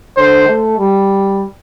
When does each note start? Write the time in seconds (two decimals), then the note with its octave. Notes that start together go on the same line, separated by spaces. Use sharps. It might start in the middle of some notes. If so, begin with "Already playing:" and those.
0.17 D3 C5
0.47 A3
0.78 G3